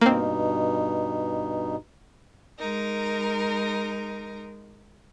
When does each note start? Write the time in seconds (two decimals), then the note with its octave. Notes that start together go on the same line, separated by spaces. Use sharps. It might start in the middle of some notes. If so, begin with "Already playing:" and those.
0.01 G2 B2 A#3 C4 D#4
2.59 G#3 D#4 A#4